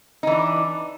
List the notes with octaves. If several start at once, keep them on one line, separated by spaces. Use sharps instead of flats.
E3 D4 D#4